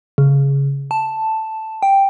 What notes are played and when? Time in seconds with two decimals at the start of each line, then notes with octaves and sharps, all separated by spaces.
0.18 C#3
0.91 A5
1.83 G5